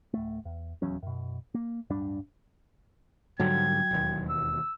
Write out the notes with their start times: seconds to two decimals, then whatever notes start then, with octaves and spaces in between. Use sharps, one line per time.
0.14 D1 A3
0.45 E2
0.82 D#1 E2 F#3 C#4
1.03 F#2 B2
1.54 A#3
1.90 D1 G2 G3 D4
3.40 G#2 D3 F#3 G3 G5 G#6
3.91 E1 D#2
4.29 E6